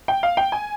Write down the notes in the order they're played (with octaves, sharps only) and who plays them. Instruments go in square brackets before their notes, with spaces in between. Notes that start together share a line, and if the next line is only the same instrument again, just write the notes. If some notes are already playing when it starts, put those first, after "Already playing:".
[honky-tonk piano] G5
F5
G5
G#5